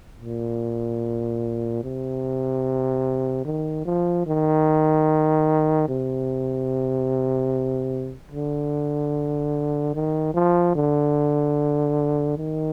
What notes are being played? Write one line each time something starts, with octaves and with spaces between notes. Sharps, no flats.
A#2
C3
D#3
F3
D#3
C3
D3
D#3
F3
D3
D#3